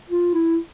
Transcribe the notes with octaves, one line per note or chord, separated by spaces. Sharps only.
F4
E4